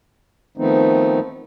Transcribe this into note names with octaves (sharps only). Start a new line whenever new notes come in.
D#3 F3 A3 B3 C4 D#4